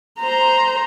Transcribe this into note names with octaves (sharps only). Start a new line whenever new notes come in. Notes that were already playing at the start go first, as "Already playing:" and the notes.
C5 A#5